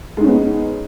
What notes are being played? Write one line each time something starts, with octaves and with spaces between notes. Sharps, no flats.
G#3 B3 C#4 D#4